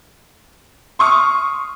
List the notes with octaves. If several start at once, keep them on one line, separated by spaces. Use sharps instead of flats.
C6 C#6 D#6 F6